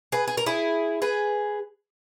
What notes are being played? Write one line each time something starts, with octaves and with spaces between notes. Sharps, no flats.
G#4 B4
G#4
A#4
E4 G#4
G#4 B4